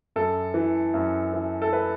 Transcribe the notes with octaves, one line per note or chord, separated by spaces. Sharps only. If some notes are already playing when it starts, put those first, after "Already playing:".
F#2 A4
E3
F#2
E3
A4
B4